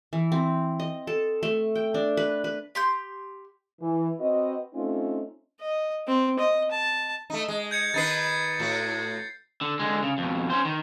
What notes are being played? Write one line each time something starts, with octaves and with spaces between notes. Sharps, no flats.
E3
C4
D#5
A4
A3
G5
D4
B4
B4
G4 C6 G6
E3
C4 F#4 B4 D#5
A3 C4 C#4 D#4 F4
D#5
C4
D#5
A5
A3 D#4
G#3
G6 G#6 C#7
D#3 D#4 B4 A6 C7
A2 F#4
D3
D3 G#3
C#3
F2 B2
C#4 C5
D#3